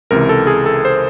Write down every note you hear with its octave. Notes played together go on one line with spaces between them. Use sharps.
C#2 C3 E3 A#4
A4
G#4
A4
C5